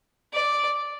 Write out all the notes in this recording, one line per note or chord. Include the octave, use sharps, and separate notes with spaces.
D5